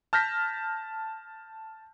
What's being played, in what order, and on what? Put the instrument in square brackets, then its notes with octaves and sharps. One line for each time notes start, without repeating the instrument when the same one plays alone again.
[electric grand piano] A5 F6 G6 A#6 B6